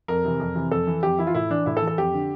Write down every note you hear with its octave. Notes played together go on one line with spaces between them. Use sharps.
F2 A#4
C3 E3
F2
C3 E3
F2 A4
E3
F2 G4
E3 E4
F4
A2 E4
E3 D4
A2 E4
A4
E3
A4
F2 G4
D3